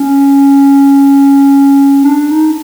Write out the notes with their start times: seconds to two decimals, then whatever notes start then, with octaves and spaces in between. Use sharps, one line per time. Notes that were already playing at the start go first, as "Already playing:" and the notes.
Already playing: C#4
2.04 D4
2.31 D#4